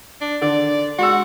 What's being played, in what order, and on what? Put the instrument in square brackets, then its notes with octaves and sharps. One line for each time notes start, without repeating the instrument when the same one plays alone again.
[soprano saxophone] D4
[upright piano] D3 [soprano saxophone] D5
[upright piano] G#3 E6 [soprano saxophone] F#4